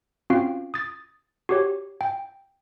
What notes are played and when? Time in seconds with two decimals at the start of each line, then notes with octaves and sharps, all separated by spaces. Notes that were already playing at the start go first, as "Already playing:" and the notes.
0.30 C4 C#4 F4 F#4 F5 G5
0.74 D#6 A6
1.49 F#4 G4 C#5
2.01 G5